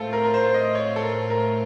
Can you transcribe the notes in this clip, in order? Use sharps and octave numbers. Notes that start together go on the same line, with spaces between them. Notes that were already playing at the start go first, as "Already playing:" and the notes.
Already playing: A2 A3 C4 F4 A4
A#4
A#4
C5
D#5
C#5
A4
A#4
A#4